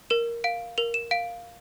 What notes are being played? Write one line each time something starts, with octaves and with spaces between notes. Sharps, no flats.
A#4 E7
F5 D7
A#4 F7
E7
F5 D7